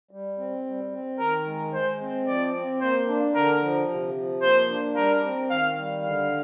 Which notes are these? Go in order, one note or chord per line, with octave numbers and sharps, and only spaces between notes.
G3
C4
G3
C4
D#3 A#4
G#3
G#3 C5
C4
F3 D5
C4
A#3 C5
D4
D3 A#4
F3
C3
F3
A#3 C5
D4
G3 A#4
C4
D#3 F5
G3
D3 F5